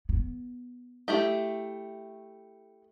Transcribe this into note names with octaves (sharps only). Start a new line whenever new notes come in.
B3
A3 E4 G4